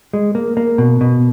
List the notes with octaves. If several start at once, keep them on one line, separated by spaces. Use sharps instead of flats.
G#3
A#3
A#3
B2
B2